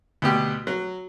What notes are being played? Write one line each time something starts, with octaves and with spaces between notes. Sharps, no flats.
D2 B2 G4
F#3